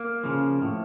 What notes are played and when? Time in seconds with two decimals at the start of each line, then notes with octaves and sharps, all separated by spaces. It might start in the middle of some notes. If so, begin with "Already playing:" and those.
Already playing: A#3
0.24 C#3 F3
0.62 A2